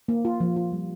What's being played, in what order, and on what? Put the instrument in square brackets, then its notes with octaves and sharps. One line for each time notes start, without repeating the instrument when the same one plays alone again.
[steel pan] A#3
F4
F3
F4
G3